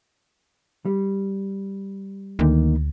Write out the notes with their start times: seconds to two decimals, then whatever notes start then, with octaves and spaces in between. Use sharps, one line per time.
0.85 G3
2.39 D2 D#3 A#3 D#4